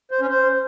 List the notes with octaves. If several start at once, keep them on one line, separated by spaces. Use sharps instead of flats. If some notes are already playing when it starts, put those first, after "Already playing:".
C5
C#4
C5